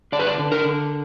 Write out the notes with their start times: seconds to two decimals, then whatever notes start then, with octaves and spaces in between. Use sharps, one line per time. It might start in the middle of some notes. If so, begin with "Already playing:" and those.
0.12 D3 D5
0.19 B4
0.26 D5
0.39 D3
0.52 A#4
0.64 D3